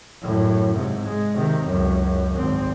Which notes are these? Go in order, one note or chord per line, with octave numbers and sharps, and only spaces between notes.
F#2 A2
G#2 C3
G#3
C3 D#3
C#2 F#2
G#1 C4